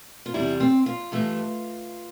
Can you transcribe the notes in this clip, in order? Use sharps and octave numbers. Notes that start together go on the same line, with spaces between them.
F4
E2 C3 G3 E4
C4
F4
G2 E3 A3